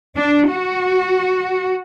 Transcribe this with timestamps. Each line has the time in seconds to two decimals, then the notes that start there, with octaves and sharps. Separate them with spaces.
0.14 D4
0.48 F#4